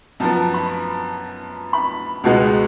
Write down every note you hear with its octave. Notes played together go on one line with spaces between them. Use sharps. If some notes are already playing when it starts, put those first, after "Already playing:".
F#2 F3 B3 A5
A5
B5
B5
C#2 B2 G#3 B3